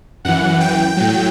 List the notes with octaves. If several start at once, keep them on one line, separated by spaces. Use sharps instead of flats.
F#2 E3 F#5
G5
A2 F#3